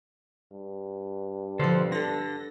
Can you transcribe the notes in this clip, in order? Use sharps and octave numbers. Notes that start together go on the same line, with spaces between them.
G2
B2 D3 F3 A4 C5
D3 A4 B4 A#6